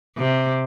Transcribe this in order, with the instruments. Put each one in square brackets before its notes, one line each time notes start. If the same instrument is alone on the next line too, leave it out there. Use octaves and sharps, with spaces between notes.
[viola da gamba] C3